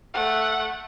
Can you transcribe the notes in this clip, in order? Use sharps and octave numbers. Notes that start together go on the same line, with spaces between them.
A3 F#5